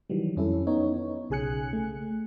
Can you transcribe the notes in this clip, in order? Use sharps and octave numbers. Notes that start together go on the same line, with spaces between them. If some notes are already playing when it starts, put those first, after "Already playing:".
D#3 E3 F#3 G3
F2 C#4 E4 A4
B3 D#4 C#5
B1 C#3 G#4 G#5 F#6 C#7
A3